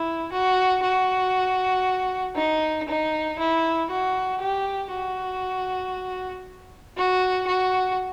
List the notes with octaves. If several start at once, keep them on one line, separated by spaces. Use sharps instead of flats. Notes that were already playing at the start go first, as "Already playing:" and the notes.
Already playing: E4
F#4
F#4
D#4
D#4
E4
F#4
G4
F#4
F#4
F#4